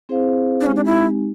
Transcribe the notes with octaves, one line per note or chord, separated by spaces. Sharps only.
C4 E4 G#4 C5 F5
D4
G#3 C4 C#4 D#4 G4
D4
E4